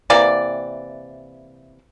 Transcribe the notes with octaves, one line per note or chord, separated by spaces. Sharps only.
C3 E3 A#3 D5